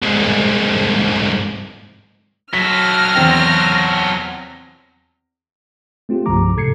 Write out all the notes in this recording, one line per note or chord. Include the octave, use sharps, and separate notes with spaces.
C2 G#2
F#3 A4 F6 A#6 B6
E2 C4 G5
A3 C4 F4 G4
C2 G2 C#3 F3 A#5 D6
G#2 C3 A4 G#6 C7 C#7